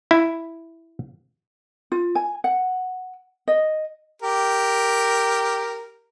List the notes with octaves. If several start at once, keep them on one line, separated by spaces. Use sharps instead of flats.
E4
F4
G#5
F#5
D#5
G4 A#4